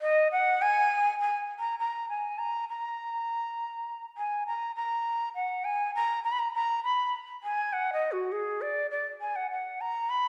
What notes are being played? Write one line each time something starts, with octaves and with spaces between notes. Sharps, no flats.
D#5
F#5
G#5
G#5
A#5
A#5
G#5
A#5
A#5
G#5
A#5
A#5
F#5
G#5
A#5
A#5
B5
A#5
A#5
B5
G#5
F#5
D#5
F#4
G#4
D5
D5
G#5
F#5
F#5
A#5
B5